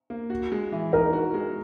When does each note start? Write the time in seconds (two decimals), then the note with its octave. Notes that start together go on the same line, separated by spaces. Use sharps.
0.10 A#3
0.30 F#4
0.52 G#3
0.72 E3
0.92 D#4 A#4
1.13 F#4
1.34 G#3